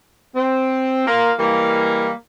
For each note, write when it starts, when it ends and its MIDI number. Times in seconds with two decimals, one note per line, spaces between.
0.35 1.06 60
1.07 1.31 58
1.07 1.31 65
1.07 1.31 77
1.39 2.09 52
1.39 2.09 55
1.39 2.09 56
1.39 2.09 58